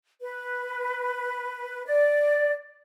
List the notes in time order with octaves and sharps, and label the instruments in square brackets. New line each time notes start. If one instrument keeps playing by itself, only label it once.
[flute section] B4
D5